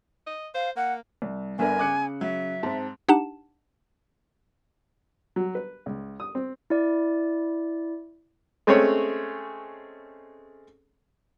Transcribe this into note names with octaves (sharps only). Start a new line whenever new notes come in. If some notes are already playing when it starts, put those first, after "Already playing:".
D#5
C5 F5
A#3 F#5
C2
G1 B3 D4 A#4 E5 G#5
C#3 D6 F#6 C#7
F#3 E5
G#2 C4 A5
D4 D#4 G4 F#5 A5 E7
F#3
B4
C#2
D#6
C4
E4 D5
G#3 A3 C4 C#4 G#4 C#5